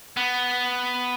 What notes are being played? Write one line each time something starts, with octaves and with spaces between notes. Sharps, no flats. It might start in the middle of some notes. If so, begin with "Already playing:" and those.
B3